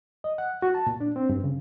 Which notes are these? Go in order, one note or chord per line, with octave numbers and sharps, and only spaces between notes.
D#5
F#5
F#4
A5
A#2
D4
C4
G2
C#3